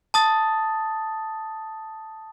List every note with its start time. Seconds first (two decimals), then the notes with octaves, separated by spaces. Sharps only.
0.14 A5 D#6 A6